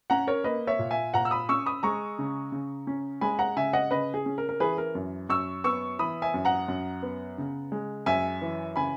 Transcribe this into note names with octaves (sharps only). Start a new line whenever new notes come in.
C#4 F#5 A#5
A#4 C#5
A#3 B4 D#5
C#5 E5
A#2
E5 G#5
A#2 F#5 A#5
E6
B5 D#6
C#4 C#6 E6
B5 D#6
G#3 A#5 C#6
C#3
C#3
C#4
G#3 G#5 B5
F#5 A#5
C#3 E5 G#5
D#5 F#5
C#3 B4 D#5
G#4
C#4
A#4
A#4
E3 G#4 B4
A#4
F#2
F#2 C#6 E6
B3 C#6 E6
E3 B5 D#6
E5 G#5
F#2
F#5 A#5
F#2
B3
C#3
G#3
F#2 E5 G#5
E3
C#3 G#5 B5